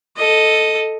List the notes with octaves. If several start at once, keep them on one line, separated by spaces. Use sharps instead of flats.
A4 D#5